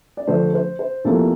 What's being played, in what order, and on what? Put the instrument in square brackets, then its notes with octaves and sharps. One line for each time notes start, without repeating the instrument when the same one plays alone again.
[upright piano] D5
F2 D3 F3 A3 C5
C5
C5
E2 C3 F3 A#3 A4